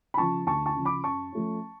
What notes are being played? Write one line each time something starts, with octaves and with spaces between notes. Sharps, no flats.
B5
C#3 F3 A5 C#6
D2 A5 C#6
A5 C#6
C#3 F3
B5 D6
F#2 A5 C#6
F3 A3 C#4